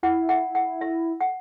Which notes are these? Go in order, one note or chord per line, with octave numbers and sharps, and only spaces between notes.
E4 F#5
F#5
F#5
E5
F#5